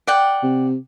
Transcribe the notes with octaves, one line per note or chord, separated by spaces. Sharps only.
D5 F#5 G5
C3